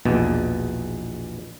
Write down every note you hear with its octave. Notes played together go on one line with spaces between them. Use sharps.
A#1 E2 B2